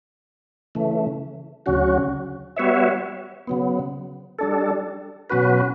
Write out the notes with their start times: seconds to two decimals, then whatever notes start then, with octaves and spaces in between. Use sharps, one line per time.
0.75 C#3 E3 A3
1.66 D2 C#3 F#3 C#4 F#4
2.56 G3 B3 F#4 C#5 E5
3.47 C#3 F#3 B3
4.39 G3 D4 A4
5.30 B2 F#3 C#4 F#4 B4